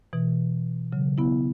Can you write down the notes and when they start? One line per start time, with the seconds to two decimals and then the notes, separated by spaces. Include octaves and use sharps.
0.13 B2 E3
0.92 C#3 F#3
1.18 B3 E4